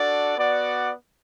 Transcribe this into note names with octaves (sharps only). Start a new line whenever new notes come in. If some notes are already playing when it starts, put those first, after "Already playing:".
Already playing: D4 F#4 A4 D5 F#5
B3 F#4 D5 F#5